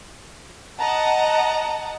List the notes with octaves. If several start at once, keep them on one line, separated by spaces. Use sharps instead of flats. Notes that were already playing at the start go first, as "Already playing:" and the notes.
D#5 F#5 A5 A#5